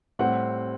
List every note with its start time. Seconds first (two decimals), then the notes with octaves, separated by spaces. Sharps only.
0.19 A2 G3 C4 F#5